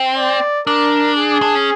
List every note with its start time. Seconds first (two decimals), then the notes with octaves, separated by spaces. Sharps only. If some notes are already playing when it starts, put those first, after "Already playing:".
Already playing: C4
0.17 D5
0.67 D4 A#4
1.18 G#4
1.42 D4
1.55 C#4